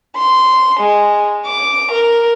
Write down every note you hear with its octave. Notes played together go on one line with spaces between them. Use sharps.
C6
G#3
D6
A#4